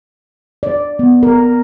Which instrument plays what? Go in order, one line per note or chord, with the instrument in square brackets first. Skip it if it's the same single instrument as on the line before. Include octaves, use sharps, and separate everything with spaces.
[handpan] D5
B3
A#4